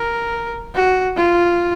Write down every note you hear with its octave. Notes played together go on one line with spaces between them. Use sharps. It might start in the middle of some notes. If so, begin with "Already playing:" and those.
Already playing: A#4
F#4
F4